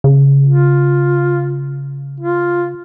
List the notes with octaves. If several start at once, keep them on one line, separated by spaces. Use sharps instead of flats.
C#3
F4
F4